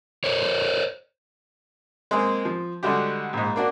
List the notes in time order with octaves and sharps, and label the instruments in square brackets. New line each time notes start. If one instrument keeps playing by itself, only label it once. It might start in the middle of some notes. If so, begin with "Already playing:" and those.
[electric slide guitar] A#4 C5 C#5
[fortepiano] G#3 A#3 C4 G#4
F3
D3 G3 G#3 F#4 G4
A#1 G#2
A#3 D4 F#4